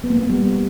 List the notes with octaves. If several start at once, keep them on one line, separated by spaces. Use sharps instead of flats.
B3
A#3
B3
A#3
G3